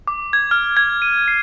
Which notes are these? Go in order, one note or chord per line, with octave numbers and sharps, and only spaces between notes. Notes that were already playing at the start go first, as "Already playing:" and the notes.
D6
G#6
F6
G#6
D#7
C7